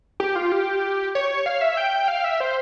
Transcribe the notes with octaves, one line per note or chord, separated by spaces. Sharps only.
G4
F4
G4
C#5
F5
E5
G5
F5
E5
C5